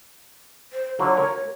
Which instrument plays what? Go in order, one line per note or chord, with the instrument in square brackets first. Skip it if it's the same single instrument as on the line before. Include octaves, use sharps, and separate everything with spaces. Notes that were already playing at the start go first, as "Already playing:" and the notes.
[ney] C5
[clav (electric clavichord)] D3 F#3 F4 [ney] C#5
[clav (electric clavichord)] A#4